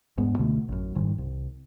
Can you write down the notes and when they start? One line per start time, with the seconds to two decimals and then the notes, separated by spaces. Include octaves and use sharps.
0.18 E1 G#2 G#3 B3
0.38 C#2 B2 D3 A3
0.69 A1 F#2
0.95 F#1 G#2 D#3 G3
1.18 C2